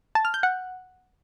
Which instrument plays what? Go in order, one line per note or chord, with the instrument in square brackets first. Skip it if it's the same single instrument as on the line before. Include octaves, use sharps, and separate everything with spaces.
[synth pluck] A5
F6
G6
F#5